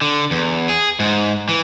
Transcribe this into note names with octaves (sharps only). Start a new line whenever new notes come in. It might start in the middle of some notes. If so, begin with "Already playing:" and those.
D3
E2
G#4
G#2
E3